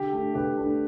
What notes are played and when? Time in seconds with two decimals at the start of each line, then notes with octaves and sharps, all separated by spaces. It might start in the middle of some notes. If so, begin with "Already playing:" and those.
Already playing: D3 G4
0.13 A3 D4
0.35 D3 G4 B4
0.57 A3 D4